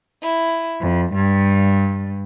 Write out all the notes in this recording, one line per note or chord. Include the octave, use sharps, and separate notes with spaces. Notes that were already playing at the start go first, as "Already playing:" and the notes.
E4
F2
G2